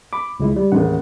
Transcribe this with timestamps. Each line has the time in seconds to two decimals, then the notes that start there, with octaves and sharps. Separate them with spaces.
0.13 B5 D6
0.40 C#2 G#3 E4
0.56 G3
0.72 A1 D#2 G#4 F#5